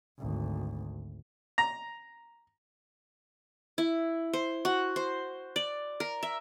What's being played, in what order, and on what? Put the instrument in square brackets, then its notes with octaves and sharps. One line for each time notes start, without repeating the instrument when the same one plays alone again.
[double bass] G#1 D2
[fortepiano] A#5
[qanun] E4
C5
F#4
C5
D5
A#4
E5